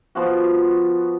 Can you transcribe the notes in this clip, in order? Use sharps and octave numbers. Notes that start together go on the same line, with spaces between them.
F3 B3 F4 F#4